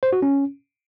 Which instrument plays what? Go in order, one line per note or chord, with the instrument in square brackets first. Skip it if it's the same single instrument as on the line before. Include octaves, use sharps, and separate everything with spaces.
[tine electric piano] C5
F#4
C#4